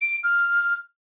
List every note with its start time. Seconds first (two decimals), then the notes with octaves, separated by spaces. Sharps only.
0.01 D7
0.24 F6